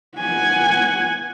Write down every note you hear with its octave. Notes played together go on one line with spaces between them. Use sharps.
F#5 G#5